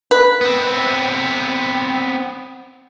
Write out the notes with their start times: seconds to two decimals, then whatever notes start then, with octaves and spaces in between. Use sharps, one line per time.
0.11 B4
0.41 B3 C4